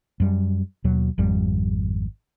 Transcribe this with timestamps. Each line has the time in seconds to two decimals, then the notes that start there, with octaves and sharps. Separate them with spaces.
0.20 F#2 G3
0.84 D#2 B2 F#3
1.18 G#1 F2 G3